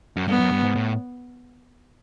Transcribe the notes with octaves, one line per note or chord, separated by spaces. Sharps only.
F#2
G2 B3
F#2
G2
G#2
A2